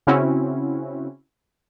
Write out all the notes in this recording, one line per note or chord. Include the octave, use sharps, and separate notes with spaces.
C#3 C4 C#4 E4 F#4